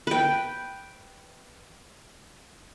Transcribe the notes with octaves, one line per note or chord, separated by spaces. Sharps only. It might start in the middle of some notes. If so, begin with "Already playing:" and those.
B4 G5